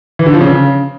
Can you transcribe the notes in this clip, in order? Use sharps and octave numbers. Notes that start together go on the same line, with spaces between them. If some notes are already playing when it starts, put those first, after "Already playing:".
E3
D3
F3
C#3